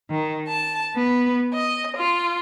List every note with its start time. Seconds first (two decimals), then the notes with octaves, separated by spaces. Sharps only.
0.10 D#3
0.48 A5
0.95 B3
1.52 D#5
1.97 F4